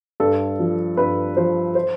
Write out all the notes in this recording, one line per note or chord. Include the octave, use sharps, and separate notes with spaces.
G2 A4
F3
G2 B4
F3 C5
C5